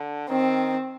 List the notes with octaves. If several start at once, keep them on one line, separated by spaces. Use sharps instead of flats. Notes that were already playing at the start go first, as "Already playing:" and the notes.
Already playing: D3
D#3 C4